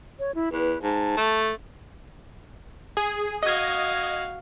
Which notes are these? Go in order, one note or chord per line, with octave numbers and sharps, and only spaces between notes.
C#5
E4
E2 B4
G#2 A5
A3
G#4
F#4 D#5 F5 G#6